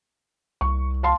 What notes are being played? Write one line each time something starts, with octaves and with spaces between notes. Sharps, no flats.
C2 C#6
F5 A5 C6